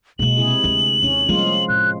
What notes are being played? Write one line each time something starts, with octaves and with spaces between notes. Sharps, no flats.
B2 G#3 A#3 F#7
C3 E4 G#4
D2 G#3
D#2 C#4
F3 G3 G#3 A#3 F4
A2 F#6